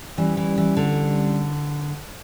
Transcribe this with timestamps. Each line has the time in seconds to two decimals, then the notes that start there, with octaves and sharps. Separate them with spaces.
0.18 E3 G3 C#4 G4 D5
0.37 E3
0.57 E3
0.77 D3